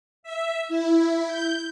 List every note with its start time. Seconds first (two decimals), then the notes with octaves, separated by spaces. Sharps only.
0.23 E5
0.68 E4
1.27 G6